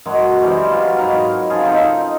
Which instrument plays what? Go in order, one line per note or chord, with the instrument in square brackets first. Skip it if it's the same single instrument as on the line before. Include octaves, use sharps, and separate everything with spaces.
[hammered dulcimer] F#2 F#3 G#3
C3 E3 G3 G#3
F#3 F4
G#2 F#3 A#4 B5
C#3 F3 F4 G#4
C4 D#4 A4